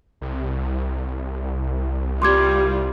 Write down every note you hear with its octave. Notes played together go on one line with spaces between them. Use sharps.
C2
G3 F4 C6 D6 G#6